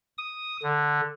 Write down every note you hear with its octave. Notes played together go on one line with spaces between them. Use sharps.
D#6
D3